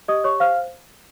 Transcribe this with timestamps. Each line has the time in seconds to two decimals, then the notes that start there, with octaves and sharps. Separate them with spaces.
0.08 G4 D#5 D#6
0.24 G4 C#5 C#6
0.40 C5 F5 F6